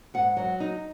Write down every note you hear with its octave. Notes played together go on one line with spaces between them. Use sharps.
G#2 F#5
F#3
D#4